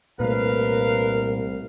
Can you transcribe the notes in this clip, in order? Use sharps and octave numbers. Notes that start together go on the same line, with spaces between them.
C2 A#2 A3 A#4 B4 F5